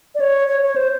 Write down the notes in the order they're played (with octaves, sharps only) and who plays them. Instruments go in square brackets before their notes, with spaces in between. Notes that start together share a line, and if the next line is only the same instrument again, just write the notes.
[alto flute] D5
C#5
C#5
C#5
C5